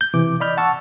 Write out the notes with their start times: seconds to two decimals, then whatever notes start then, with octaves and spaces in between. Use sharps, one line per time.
0.01 G6
0.14 C3 E3 D6
0.40 D5 D#5 B5 F6 G6
0.57 F#5 A5 C#6 E6